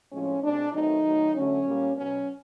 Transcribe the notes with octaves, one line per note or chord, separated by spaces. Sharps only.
A2 F3 G#3 C4 C#4
B2 G#3 C4 D4
D#3 F#3 A3 C4 D#4
D#3 F#3 A3
D3 F#3 A3 C#4
A#2 G3 A#3
B2 F#3 B3 C#4